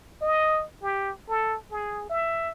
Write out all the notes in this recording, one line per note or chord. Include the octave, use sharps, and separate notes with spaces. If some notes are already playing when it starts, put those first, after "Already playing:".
D#5
G4
A4
G#4
E5